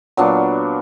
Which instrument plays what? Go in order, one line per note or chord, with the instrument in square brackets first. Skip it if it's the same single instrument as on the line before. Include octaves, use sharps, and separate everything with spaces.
[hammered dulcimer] A#2 F#3 B3 D4